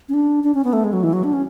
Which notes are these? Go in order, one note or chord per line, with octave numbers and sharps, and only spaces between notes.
C#4
D4
D4
C#4
B3
A3
G#3
F#3
E3
F#3
D4
C#4